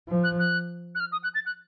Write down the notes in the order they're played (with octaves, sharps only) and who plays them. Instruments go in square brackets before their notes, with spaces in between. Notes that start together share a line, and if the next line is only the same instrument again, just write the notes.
[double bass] F3
[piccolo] F#6
F#6
F#6
F6
D#6
F#6
A6
F#6